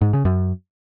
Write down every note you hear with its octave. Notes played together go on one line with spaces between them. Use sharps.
G#2
C#3
F#2